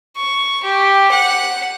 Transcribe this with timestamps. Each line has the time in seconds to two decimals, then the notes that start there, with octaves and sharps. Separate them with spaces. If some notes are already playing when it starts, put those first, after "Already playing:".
0.17 C#6
0.63 G4
1.12 F#5